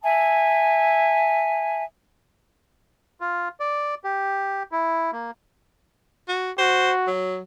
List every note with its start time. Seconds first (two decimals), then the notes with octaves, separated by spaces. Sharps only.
0.04 E5 G#5 A5
3.21 F4
3.60 D5
4.04 G4
4.72 E4
5.13 A#3
6.28 F#4
6.58 F#4 C5
7.07 F#3